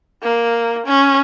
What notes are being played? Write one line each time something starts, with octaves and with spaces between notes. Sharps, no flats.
A#3
C#4